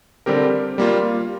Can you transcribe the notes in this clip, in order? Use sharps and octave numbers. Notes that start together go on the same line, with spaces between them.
D3 G3 C4 G4 A#4
G3 A#3 F4